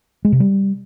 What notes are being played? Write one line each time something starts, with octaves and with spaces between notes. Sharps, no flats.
G#3
C3
G3